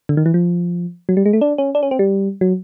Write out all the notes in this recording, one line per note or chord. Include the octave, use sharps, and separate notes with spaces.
D3
D#3
E3
F3
F#3
G3
G#3
A3
D4
C#4
D4
C#4
C4
G3
F#3